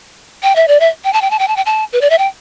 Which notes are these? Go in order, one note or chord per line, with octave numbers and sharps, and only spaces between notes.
G5
E5
D5
E5
G5
A5
G5
A5
G5
A5
G5
A5
B4
D5
E5
G5